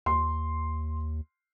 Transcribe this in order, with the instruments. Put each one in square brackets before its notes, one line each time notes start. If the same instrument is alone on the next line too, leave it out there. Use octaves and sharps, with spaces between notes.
[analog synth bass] D#2 [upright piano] C6